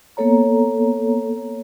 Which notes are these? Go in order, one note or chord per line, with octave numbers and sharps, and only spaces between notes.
A#3 B3 A4 C#5 A#5